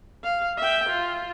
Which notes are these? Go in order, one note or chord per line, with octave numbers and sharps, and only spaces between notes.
F5
E5 G5
F4